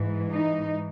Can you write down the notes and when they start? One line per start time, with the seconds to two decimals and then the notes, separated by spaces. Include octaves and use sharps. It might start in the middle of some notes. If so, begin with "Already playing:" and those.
Already playing: G#2 E3
0.28 D#4